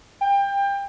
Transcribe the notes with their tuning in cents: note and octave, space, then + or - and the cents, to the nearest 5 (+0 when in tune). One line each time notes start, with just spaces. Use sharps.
G5 +25